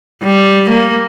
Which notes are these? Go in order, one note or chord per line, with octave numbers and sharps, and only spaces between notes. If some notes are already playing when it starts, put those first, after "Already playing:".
G3
A#3